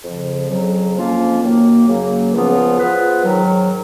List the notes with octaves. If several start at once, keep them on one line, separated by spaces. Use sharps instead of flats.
F2 C#3 F3
F2 C#3 F#3
F2 F3 A#3 C#4 F4
F#2 D#3 A#3
F#2 C#3 F#3 A#3
C#2 C#3 F3 B3 F4
F3 B3 F4 G#4 B4
G#2 D#3 F#3